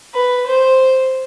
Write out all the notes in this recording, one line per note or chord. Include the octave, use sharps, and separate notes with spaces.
B4
C5